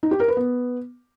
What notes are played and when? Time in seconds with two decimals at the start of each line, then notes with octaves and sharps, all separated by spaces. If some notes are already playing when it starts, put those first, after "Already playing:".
0.03 D#4
0.11 G4
0.20 A#4
0.28 B4
0.37 B3